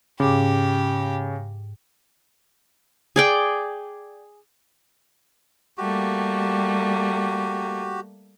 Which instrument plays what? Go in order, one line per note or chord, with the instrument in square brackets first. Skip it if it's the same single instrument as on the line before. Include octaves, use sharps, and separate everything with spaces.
[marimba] G#2 D6 [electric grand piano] C#3 [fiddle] G4
[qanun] G#4 D5 G5
[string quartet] G3 A3 A#3 [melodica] F#4 G4